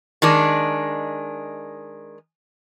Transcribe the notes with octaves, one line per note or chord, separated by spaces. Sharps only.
D#3 G#3 D4